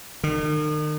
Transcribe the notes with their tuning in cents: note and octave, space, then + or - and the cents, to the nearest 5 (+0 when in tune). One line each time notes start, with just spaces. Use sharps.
D#3 -40